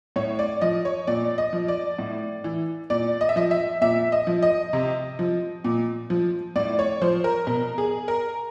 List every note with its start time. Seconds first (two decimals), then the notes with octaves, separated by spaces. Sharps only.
0.16 A2 C#5
0.39 D5
0.61 F3 D#5
0.85 C#5
1.07 A#2 D5
1.38 D#5
1.53 F3
1.68 D5
1.99 A2
2.44 E3
2.90 A#2 D5
3.21 D#5
3.29 E5
3.36 F3 D#5
3.51 E5
3.81 A#2 E5
4.12 D#5
4.27 F3
4.42 D#5
4.73 C3
5.19 F3
5.64 A#2
6.10 F3
6.56 A2 D5
6.79 C#5
7.01 F3 C5
7.24 A#4
7.47 B2 A#4
7.78 G#4
8.08 A#4